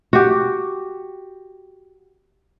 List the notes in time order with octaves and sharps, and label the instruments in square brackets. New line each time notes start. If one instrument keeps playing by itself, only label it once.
[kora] F#4 G4